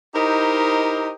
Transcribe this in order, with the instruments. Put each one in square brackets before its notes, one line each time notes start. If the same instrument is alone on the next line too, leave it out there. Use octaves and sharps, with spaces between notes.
[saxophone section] D#4 E4 G4 A#4 C5 D#5